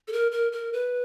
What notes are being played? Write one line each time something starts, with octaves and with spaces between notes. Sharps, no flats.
A4
A#4
A#4
A#4
B4